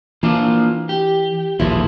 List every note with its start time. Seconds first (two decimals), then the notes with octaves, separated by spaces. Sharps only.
0.23 E3 A#3 D4 F4
0.89 G4
1.60 D#1 A1 D#2 F3 G#3 E4